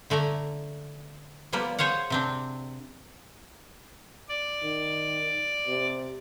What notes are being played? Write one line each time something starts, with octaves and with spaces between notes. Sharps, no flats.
D3 A3 D5 A#5
F3 G3 A#3 B3 D5
G#4 C5 C#5 F5 F#5
C3 C4 D4
D5
D#3
C3